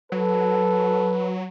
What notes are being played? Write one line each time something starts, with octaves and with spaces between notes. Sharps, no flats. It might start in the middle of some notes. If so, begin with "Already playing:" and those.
F#3 A4 B4